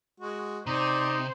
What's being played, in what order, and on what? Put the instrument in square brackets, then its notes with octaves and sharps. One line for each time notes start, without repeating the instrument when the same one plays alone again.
[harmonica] G#3 F#4
[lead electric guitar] C3 [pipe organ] D#4 [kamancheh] C5 [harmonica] D5